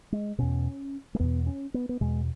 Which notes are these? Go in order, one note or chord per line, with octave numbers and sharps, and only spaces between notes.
G#3
E2 B2 C#4
G#3
E2 B2 B3
C#4
B3
B3
E2 B2 G#3